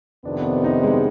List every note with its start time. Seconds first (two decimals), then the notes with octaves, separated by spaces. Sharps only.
0.25 F2 C3 D#3 B3 D4
0.45 D4
0.64 D#4
0.83 G#3